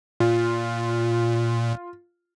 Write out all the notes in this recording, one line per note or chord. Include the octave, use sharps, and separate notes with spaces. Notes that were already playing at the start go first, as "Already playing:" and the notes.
A#2 F4